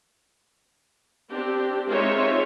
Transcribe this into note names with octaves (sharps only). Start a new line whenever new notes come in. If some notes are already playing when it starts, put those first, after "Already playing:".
C4 D4 G4
G#3 C4 D#4 F4 C#5 E5